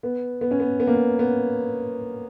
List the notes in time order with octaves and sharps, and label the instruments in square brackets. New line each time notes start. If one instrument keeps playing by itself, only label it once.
[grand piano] B3
B3
C#4
B3
B3
A#3
B3
B3